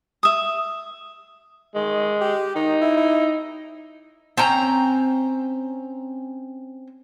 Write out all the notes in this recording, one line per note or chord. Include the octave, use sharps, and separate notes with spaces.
E5 D#6
D#3 G#3
G4
D#3 D#4
E4
E4
C4 C#4 G5 A#5